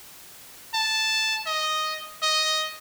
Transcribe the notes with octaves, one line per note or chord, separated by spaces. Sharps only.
A5
D#5
D#5